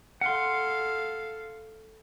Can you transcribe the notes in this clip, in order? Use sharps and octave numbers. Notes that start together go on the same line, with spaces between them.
A4 F5 F#5 C6